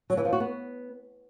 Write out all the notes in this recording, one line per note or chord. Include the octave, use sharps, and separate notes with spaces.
F#3
E3
F3
F#4
B3